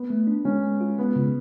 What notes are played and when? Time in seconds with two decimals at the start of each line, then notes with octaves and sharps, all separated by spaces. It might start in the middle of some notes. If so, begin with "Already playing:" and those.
Already playing: B3
0.10 A3
0.27 D4
0.45 G#3 C#4
0.63 G#3
0.81 F4
0.98 G#3 B3
1.16 C#3